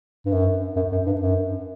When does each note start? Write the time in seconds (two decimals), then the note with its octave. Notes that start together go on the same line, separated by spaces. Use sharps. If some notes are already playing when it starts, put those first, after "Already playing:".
0.25 G2
0.32 F#2
0.76 F#2
0.92 F#2
1.06 G2
1.21 F#2